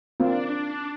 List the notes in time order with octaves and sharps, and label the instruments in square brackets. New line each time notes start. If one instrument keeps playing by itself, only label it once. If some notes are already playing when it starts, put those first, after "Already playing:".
[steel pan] A#3 C4 F4 [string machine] D4